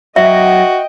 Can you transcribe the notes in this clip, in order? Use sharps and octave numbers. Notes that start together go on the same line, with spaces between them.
F#3 F#4 D#5 E5 G5